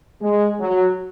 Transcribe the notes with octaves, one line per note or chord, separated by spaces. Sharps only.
G#3
F#3